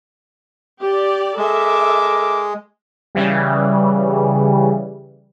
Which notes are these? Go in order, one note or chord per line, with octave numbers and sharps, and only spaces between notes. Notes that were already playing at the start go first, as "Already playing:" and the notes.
G4 D5
G#3 A4 A#4 E5 D6
C#3 E3 G3